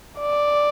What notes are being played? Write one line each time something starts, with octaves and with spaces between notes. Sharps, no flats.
D5